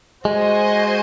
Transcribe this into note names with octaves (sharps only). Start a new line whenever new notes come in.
G#3 F#4 C5 D#5 G#5